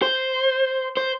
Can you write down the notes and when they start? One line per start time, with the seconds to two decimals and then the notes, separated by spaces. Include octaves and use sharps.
0.02 C5
0.97 C5